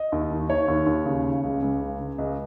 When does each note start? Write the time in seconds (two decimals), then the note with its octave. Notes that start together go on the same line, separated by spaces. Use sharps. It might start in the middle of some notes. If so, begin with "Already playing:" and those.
Already playing: D#5
0.12 D#2
0.31 D#3
0.49 D#3 C#5
0.68 D#2
0.86 D#2
1.06 C#3
1.24 C#3
1.44 C#2
1.62 C#2
1.81 C#3
1.99 C#3
2.18 C#2 D#5